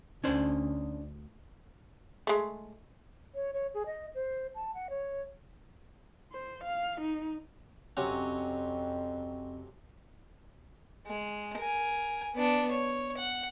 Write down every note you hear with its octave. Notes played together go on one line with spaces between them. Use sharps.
D2 C#4 D4 C5
G#3 A3
C#5
C#5
G#4
D#5
C5
A5
F#5
C#5
C5
F5
D#4
F2 C3 F#3 C#4
G#3
A#4 G#5
B3 D4
C#5
F#5